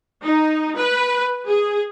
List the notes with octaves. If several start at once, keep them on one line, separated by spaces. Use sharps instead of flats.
D#4
B4
G#4